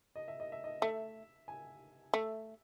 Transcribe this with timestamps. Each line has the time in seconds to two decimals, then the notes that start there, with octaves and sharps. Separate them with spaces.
0.16 D#5
0.28 E5
0.40 D#5
0.52 E5
0.64 D#5
0.82 A3 E5
1.48 G#5
2.14 A3 E5